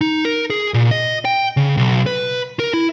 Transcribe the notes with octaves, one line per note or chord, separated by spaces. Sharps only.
D#4
A#4
G#4
A#2
D#5
G5
C#3
B1
B4
A#4
E4